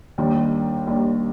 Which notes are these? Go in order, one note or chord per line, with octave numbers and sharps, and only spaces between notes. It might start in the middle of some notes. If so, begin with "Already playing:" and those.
D#2 D#3 G3 D4
D#2 D#3 G3 D4